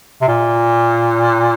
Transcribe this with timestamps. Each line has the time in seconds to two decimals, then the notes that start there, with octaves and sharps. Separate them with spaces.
0.21 C3
0.28 A#2